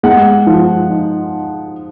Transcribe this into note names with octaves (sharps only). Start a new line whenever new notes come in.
G#3 F#5
F3
D#4